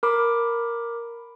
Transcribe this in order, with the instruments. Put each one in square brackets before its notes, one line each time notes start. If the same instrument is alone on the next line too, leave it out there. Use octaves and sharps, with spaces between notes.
[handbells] A#4 B5 D6